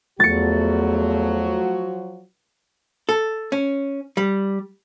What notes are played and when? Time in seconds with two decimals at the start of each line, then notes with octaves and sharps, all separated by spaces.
0.20 E2 F3 F#3 A3 F#4 A6 C#7
3.09 A4
3.52 C#4
4.17 G3